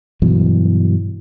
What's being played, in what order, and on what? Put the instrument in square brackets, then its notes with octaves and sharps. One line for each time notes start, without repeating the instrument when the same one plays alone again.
[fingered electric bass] G2 B2 E3 F#3